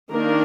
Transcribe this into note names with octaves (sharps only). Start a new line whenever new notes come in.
D#3 A#3 D4 A#4